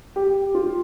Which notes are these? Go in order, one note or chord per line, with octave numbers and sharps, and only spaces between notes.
G4
F4